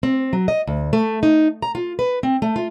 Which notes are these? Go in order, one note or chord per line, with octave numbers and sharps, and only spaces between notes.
C4
F#3
D#5
D2
A3
D#4
A#5
F4
B4
C4
A3
F4